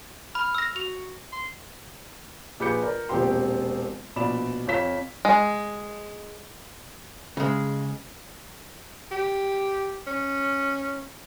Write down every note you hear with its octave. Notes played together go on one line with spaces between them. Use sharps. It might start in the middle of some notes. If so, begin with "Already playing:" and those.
B5 F6
E6 A#6
F#4 F7
C6
A#1 G#4 B4 D6 G6 C#7
A#4 D5
E1 A#1 C4 G4 G5 C6
A#1 B2 D5 B5 E7
F2 C#5 F5 B6 E7
G#3
C#3 G#3
G4
C#4